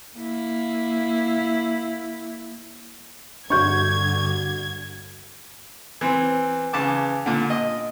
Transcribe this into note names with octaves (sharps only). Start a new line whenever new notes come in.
A#3 E4
G2 D3 D4 F#4 C#6 G6 G#6
E3 C4
C#3 E3 A5 D6
A#2 D3
D#5